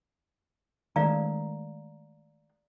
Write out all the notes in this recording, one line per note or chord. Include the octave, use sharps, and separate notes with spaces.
D#3 G#3 A3 D5 F5 A#5